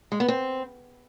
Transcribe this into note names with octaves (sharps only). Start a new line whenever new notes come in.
G#3
B3
C4